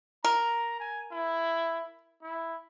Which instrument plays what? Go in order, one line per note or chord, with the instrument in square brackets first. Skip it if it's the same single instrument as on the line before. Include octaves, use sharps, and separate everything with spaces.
[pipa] A#4 [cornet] A#5
[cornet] G#5
E4
E4